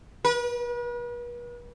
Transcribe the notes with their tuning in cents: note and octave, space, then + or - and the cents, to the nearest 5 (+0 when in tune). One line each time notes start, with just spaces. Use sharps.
B4 -40